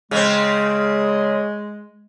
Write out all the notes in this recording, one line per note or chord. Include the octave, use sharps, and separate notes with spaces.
C#3 G#3 C4